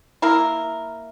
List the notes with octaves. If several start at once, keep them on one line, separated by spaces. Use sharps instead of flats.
A#3 E4 A#4